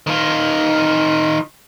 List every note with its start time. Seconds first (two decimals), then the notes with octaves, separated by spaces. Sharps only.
0.07 D#3 F4